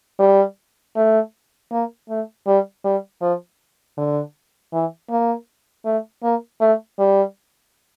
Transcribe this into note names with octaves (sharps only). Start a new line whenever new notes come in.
G3
A3
A#3
A3
G3
G3
F3
D3
E3
A#3
A3
A#3
A3
G3